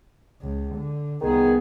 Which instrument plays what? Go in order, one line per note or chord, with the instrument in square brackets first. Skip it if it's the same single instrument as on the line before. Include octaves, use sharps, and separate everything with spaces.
[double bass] C#2
D3
[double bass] C2 B3 [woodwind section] D#3 G#4